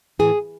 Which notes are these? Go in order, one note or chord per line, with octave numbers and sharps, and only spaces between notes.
A2 E3 G#4